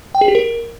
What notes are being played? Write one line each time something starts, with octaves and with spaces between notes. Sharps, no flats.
G5
G#4
G4
A#4